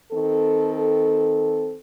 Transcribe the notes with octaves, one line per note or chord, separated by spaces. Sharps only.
D#3 C4 A4